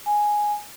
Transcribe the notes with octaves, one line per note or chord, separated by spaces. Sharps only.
G#5